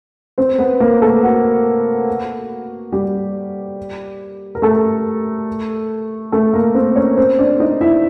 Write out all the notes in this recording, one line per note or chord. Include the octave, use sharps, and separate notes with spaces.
C4 C5
B3 B4
A#3 A#4
A3 A4
F#4
G3 G4
A#4
A3 A4
A3 A4
A#3 A#4
C4 C5
C#4 C#5
C4 C5
D4 D5
D#4 D#5
E4 E5